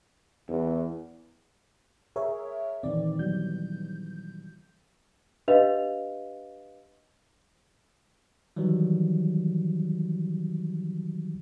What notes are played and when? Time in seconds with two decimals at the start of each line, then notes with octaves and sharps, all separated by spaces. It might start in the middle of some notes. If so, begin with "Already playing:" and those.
0.48 E2
2.16 G#4 A#4 C#5 E5
2.83 A#2 D#3 E3 C4 D5
3.19 F#3 G3 B3 G6
5.48 D4 G4 B4 D#5 F5 F7
8.56 D#3 E3 F#3 G3